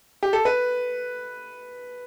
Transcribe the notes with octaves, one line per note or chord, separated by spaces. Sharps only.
G4
A4
B4